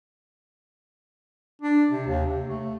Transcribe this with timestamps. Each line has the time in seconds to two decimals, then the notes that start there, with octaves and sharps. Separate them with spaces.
1.62 D4
1.91 C3
2.07 D#2
2.27 C3
2.48 A3